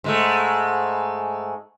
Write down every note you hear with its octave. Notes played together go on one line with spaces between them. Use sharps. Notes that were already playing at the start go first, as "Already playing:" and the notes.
G#2 G#3 A3